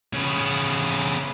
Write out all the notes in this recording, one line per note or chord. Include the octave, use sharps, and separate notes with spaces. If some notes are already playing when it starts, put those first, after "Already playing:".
C#3 B3